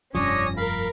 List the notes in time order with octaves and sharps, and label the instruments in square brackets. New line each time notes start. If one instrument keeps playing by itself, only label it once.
[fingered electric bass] F1 G2 F3 [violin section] C#4 A#6 [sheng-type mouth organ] D4 C#5 D#6
[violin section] A#4 [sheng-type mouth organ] F5 B5